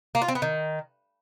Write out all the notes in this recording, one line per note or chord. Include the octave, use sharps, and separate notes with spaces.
A#3
F4
C4
B3
D#3